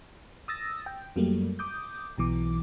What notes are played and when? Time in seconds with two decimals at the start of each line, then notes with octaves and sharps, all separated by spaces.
0.48 D#6 E6 A6 A#6
0.86 G5
1.16 F#2 F#3 G3 A3 A#3
1.59 D6 D#6 G6
2.18 B1 B2 E3 D6